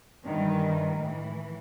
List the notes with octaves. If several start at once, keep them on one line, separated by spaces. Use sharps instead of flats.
G2 D#3 E3
A2 E3